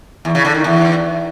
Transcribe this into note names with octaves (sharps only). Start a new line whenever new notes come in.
E2
C#3
D3
D#3
E2